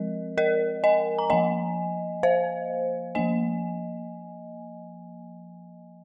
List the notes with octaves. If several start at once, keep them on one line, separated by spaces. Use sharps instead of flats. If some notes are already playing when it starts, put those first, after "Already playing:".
Already playing: F3 G#3 C4 A#4 D#5
A#4 D#5
D#5 G#5
A#5
F3 A#3 D#5 G#5
C5 F5
F3 A#3 D#5 G#5